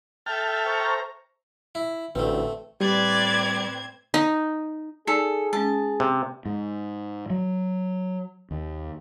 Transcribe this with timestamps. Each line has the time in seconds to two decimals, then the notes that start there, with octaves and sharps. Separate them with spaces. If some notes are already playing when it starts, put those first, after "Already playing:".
0.26 A4 E5 G5 A5 F6
0.66 C5 A#5 C#6
1.75 E4
2.15 A1 D2 A3 C4 B4
2.81 A2 G3 C4 B4 D5 G#6
4.14 D#4
5.07 D#4 G#4 A4 D5 G#5
5.53 G#3 C#4 A5
6.00 C3
6.45 G#2
7.30 F#3
8.51 D#2